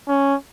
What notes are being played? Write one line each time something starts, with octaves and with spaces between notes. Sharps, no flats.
C#4